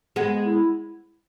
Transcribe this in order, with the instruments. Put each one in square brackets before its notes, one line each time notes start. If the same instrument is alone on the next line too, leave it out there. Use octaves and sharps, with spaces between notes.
[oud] G#3 B3
[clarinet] E4